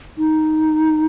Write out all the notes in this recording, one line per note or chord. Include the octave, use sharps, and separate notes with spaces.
D#4